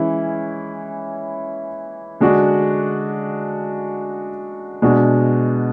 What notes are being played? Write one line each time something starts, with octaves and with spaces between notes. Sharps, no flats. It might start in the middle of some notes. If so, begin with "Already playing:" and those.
Already playing: E3 G#3 C#4 E4
D3 G#3 D4 F#4
B2 G#3 D4 F#4